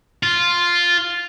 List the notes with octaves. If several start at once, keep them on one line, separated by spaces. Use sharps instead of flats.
F4